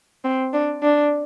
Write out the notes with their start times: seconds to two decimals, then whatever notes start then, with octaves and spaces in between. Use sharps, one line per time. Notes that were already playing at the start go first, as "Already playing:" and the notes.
0.25 C4
0.53 D4
0.83 D4